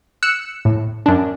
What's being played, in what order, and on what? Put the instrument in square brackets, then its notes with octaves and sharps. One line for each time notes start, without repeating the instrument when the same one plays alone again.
[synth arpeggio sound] E6 F#6 C#7 E7
A2
F#2 D4